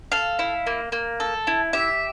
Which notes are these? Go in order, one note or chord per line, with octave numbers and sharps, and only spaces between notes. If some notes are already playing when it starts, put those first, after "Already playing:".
A4 F5
E4
A#3
A#3
A4
E4
G4 E5